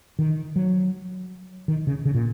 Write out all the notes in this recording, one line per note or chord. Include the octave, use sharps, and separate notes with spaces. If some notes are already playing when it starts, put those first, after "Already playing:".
D#3
F#3
D#3
C#3
C#3
A#2